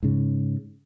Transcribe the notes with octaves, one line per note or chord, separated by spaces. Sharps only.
G#2 C#3